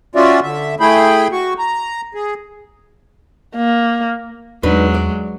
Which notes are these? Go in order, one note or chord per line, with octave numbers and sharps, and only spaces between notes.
C#4 F4 F#4 D5 E5
D3 E5
A3 E4 G#4 G5 B5
F#4 C#6
A#5
G#4
A#3
E2 F#3 G#3 D4 D#4 B4
D5